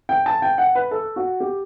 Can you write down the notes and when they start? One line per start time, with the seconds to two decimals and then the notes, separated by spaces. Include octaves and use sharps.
0.09 G5
0.26 A5
0.42 G5
0.58 F#5
0.75 B4
0.91 A4
1.16 F#4
1.40 G4